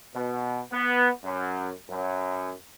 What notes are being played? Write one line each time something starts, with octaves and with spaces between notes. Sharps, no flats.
B2
B3
F#2
F#2